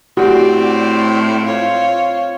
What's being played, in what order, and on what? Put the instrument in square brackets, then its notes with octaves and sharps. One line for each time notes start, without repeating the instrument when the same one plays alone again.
[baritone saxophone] A2 [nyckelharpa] C4 C5 [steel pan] F#4 G4 [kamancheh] D5
[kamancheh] F4 C#5